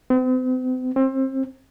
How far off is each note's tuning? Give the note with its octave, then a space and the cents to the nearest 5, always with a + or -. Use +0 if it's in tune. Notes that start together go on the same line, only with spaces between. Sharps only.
C4 -40
C4 +30